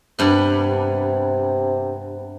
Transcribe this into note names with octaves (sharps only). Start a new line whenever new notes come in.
G2 C3 B3